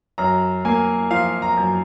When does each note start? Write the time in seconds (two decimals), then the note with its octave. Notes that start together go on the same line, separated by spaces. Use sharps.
0.18 F#2 A#5
0.65 A#3 G#5
1.11 F3 F5
1.42 A#5
1.57 F#2